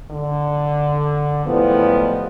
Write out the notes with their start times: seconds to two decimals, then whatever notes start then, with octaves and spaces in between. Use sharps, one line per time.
0.11 D3
1.46 E2 A2 F3 G3 G#3 B3